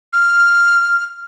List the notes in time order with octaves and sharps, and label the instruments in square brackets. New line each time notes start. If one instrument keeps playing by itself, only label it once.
[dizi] F6